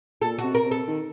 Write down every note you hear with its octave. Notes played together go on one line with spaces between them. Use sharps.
A#2 A4
C3 F#4
A#4
C3
A4
D#3